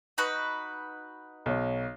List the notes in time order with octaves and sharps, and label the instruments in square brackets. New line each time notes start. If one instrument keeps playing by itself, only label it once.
[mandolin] D#4 F#4 B4
[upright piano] B1 C#5